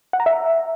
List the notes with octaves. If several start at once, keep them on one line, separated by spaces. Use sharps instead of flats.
F#5
A#5
E5